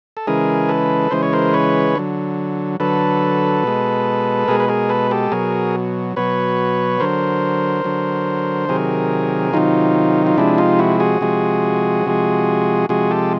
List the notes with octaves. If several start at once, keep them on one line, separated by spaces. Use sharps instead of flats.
A4
C#3 E3 G#3 G#4 A#4
A4 B4
C#3 E3 G#3 C5
C#5
A#4 C5
B4 C#5
D3 F#3
D3 F#3 A4 B4
B2 G#3
B2 G#3 G#4 A#4
B4
G#4 A#4
A4 B4
G4 A4
B2 F#3 G#4 A#4
B2 F#3 B4 C#5
D3 F#3 A#4 C5
D3 F#3
C3 D#3 F#3 G#4 A#4
C3 D#3 F#3 D#4 F4
F4
C3 F3 G#3 D4 E4
D#4 F4
E4 F#4
F#4 G#4
C3 F3 G#3
C3 F3 G#3
C3 F3 G#3 F#4 G#4
G4 A4